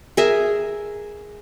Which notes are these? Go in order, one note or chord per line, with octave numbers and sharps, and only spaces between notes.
G#4 A#4 E5 A#5